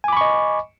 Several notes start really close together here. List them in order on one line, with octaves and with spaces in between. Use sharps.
G#5 D6 B5 C#6 D#5